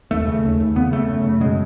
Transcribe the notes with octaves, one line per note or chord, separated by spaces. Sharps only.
D#2 A3
C#3
D#2
D#2
C#3 B3
C#3 A3
F#2
C#3
B2 G#3